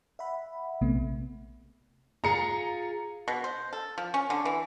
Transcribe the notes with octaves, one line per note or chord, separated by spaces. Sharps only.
E5 F#5 B5
A#1 C3 A3 B3
F4 G#4 A#5 C#7
B2
C5
A4
F3
C#4
D3
E3